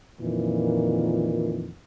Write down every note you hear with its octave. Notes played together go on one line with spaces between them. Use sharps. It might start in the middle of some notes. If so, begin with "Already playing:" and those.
F2 A#2 D#3 E3